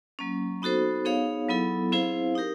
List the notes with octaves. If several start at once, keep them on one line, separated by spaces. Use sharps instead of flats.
F#3 A#3 C#4
B3 D#4 F#4 A4 C5
B3 D#4 G#4 C#5 F5
F#3 B3 E4 A4
C4 E4 G#4 C5 F5
D#4 G4 A#4